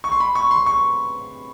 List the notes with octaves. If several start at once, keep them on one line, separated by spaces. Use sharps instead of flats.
C#6
C6
B5
C#6
C6
C#6